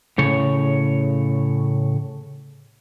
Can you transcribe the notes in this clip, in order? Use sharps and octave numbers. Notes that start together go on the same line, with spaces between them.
A2 C#3 C#5